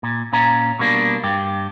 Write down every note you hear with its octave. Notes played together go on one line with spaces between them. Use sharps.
A#2
A#2 C#4 A#5
B2 G3 A#3 D4
G2 G4